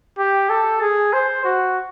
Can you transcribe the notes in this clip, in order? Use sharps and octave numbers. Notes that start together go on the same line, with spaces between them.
G4
A4
G#4
C5
F#4